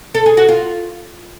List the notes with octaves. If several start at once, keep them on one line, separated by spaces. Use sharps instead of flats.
A4
G#4
F#4
F4